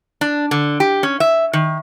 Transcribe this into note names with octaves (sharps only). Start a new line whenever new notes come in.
D4
D3
G4
C#4
E5
D#3